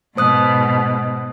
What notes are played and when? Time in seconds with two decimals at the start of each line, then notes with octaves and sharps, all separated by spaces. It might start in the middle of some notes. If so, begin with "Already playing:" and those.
0.17 G#2 B2 C5 D#6 F#6